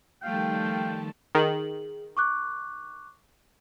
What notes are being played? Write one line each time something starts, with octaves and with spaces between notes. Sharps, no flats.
D#3 F3 G3 A3 F5 G5 A5
D#3 G#4 F#7
C#6 D6 F#6